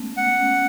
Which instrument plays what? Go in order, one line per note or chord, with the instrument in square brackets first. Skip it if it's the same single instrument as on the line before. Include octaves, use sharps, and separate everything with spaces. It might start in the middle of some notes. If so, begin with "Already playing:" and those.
Already playing: [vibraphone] G#3 A3 B3 C#4
[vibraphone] A3 [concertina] F#5
[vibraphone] C#4